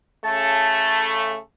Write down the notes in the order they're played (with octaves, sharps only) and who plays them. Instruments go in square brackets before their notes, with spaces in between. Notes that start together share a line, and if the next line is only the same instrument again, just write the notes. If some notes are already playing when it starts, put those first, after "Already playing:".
[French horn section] C#3 A3 [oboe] A5